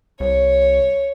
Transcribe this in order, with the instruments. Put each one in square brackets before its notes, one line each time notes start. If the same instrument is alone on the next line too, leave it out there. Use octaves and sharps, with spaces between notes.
[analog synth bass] C2 [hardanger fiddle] C#5